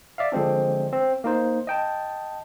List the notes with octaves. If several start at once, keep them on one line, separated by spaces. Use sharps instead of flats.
D5 E5 F5
D3 F3 G#3 C4 D4
C4
A#3 D#4 C5
D#5 G5 A5